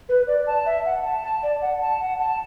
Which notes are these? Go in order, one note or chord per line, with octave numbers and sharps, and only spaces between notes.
B4
D5
A5
E5
F#5
A5
A5
D5
F#5
A5
F#5
A5